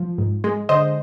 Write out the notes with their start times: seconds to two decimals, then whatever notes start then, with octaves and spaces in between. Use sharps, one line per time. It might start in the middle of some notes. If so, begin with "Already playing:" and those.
Already playing: F3
0.18 G#2
0.44 G#3
0.69 D3 C5 D#5